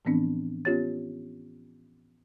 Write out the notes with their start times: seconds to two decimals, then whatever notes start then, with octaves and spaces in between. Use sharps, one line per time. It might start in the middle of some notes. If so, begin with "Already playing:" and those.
0.05 A2 E3 F3 B3 C4 D4
0.65 B3 C#4 F4 G4 C#5 A6